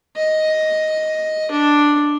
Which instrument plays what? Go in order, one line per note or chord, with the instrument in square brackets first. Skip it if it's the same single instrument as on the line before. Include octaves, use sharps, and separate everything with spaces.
[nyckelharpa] D#5
D4